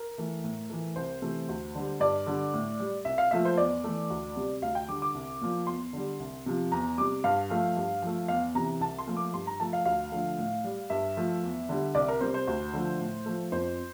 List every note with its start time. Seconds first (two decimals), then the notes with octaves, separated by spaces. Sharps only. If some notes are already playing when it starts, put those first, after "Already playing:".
Already playing: A#4
0.18 E3 A3
0.44 A2
0.70 E3 A3
0.96 C2 C5
1.22 C3 E3 A3
1.49 D2
1.75 D3 G3
2.00 G2 D5
2.27 D3 G3
2.54 A2
2.80 G3
3.05 C2 E5
3.18 F5
3.31 A#2 F3 A3 E5
3.45 C5
3.57 E2 D5
3.84 E3 A3
4.10 D2
4.36 C3 G3
4.62 D2 F5
4.75 G5
4.89 D3 G3 D6
5.02 D6
5.15 C2
5.42 A#2 F3
5.67 E2 C6
5.93 D3 G3
6.20 C2
6.46 C3 F3
6.72 E2 A#5
6.98 C3 G3 D6
7.24 G2 F5
7.50 F3 A3
7.77 G2
8.02 F3 A3
8.28 E2 F5
8.55 C3 E3 A#5
8.80 C2 A5
8.99 C6
9.07 A#2 F3 A3
9.17 D6
9.33 G2 C6
9.47 A#5
9.60 F3 A3 A5
9.73 F5
9.85 D2 F5
10.12 D3 F3 A3
10.38 A2
10.64 G3
10.90 G2 E5
11.17 F3 A3
11.43 E2
11.69 D3 G3
11.95 C2 D5
12.08 A#4
12.21 C3 G3 C5
12.34 C5
12.48 D2
12.73 D3 F3 A3
13.00 A2
13.26 F3 A3
13.52 F2 C5